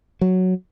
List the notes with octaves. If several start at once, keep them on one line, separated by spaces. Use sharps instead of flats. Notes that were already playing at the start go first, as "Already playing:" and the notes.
F#3